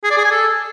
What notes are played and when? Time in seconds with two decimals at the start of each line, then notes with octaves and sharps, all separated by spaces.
0.04 G#4
0.11 D5
0.18 G#4
0.25 G#5
0.32 A4